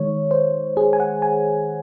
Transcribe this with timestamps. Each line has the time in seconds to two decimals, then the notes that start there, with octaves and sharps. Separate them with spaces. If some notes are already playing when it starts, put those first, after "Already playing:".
Already playing: D#3 G#3 C#5
0.31 C5
0.77 G#4
0.93 G#5
1.00 F#5
1.22 G#5